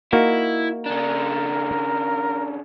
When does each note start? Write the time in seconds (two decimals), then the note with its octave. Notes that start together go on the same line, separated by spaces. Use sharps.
0.13 A#3 D#4 E4 F#4
0.86 C#3 D4 A#4